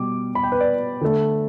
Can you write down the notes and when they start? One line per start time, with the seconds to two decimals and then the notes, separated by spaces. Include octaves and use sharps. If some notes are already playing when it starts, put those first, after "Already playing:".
Already playing: B2 G3 D6
0.35 B5
0.43 G5
0.52 B4
0.60 D5
1.01 D3 A3